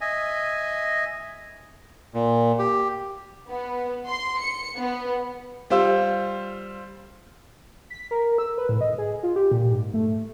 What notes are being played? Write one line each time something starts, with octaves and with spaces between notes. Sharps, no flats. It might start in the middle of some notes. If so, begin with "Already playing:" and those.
D#5 E5 G#5
A#2
G4
B3
C6
C#7
B3
G3 F4 C5 E6
B6
A#4
E6
B4
A2
D#5
G#4
F4
G4
A#2
G#2
A3